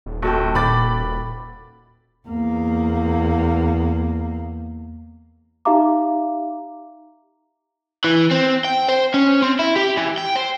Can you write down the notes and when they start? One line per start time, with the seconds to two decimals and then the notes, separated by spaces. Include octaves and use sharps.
0.06 D#1
0.22 A#1 F#4 A4 G5
0.55 A#2 B5 D6 A6
2.28 E2 A#3
5.65 D#4 G4 E5 F5 A#5 D6
8.04 E3
8.31 C4
8.65 G5
8.89 C5
9.14 C#4
9.42 C4
9.59 E4
9.76 G4
9.97 E3
10.18 G5
10.36 C5